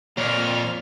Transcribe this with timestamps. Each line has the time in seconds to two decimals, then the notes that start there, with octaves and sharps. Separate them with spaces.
0.17 F2 A#2 C#5 D5 F6